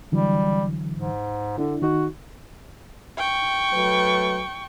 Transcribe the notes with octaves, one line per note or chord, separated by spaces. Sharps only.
D3 E3 F#3 G3
G#2
D3 D4 E4
D#3 D#4 F#4
G5 C#6
F#3 A3 B4